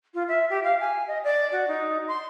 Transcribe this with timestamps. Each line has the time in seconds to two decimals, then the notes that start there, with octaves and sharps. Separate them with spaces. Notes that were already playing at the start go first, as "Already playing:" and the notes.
0.14 F4
0.28 E5
0.50 G4
0.64 F5
0.80 G#5
1.08 D#5
1.24 D5
1.52 F#4
1.68 D#4
2.08 C6